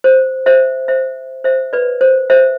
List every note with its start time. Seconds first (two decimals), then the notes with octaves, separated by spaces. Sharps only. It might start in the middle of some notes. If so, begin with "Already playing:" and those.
0.04 C5
0.46 C5 E5
0.88 C5 E5
1.44 C5 E5
1.73 B4 D5
2.01 C5
2.30 C5 E5